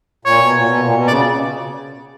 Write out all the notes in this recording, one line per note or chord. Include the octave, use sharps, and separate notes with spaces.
A#2 C#5
B2
A#2
B2
A#2
B2
C#3 D5